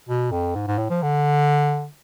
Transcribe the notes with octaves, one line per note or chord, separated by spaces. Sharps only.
B2
F2
G#2
G#2
A2
F3
D3